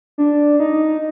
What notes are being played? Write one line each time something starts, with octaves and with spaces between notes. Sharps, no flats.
D4
D#4